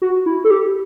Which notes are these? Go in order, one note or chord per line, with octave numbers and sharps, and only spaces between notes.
F#4
E4
A4
G4